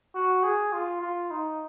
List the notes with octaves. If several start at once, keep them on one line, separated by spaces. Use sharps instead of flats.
F#4
G#4
F4
F4
D#4